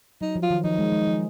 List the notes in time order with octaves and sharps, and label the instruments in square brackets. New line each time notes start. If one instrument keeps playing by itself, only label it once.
[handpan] F#3 [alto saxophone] D#4
[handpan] F3
[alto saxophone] F4
[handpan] D#3
[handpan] F3 [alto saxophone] D#4
[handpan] G#3
G#3
F3